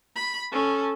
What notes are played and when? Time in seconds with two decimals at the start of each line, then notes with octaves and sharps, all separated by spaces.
0.16 B5
0.52 C#4 A4